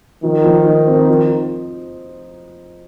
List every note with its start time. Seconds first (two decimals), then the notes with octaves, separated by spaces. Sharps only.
0.23 D#3 F3
0.45 F3
0.65 D#4
0.87 C4
1.09 F3